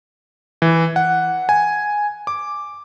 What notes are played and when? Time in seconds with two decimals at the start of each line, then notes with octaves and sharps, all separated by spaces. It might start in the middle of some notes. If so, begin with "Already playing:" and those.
0.62 E3
0.96 F#5
1.49 G#5
2.27 D6